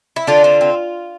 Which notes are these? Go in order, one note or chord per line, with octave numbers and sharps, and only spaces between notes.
E4
D3 D4 F4
C4
C4